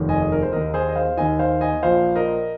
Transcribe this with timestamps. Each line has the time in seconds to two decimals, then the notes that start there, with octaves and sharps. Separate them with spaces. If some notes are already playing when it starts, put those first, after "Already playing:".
Already playing: F1 D#2 D#3
0.09 D#5 G#5
0.22 G#4
0.32 A#4
0.42 C5
0.52 D#2 D#3 A#4 D#5
0.74 G#4 C5
0.88 D#5
0.96 C5 F5
1.17 D#2 D#3 D#5 G#5
1.39 C5 F5
1.61 D#5 G#5
1.83 A#1 A#2 F3 C5 F5
2.16 A#4 D#5